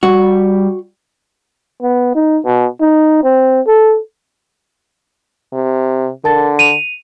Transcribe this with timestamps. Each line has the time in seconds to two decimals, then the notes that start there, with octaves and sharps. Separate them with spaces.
0.03 G3 F#4
1.82 B3
2.15 D#4
2.45 B2
2.80 D#4
3.23 C4
3.66 A4
5.53 C3
6.24 D3 A#4 A5 A6
6.59 D#7 F7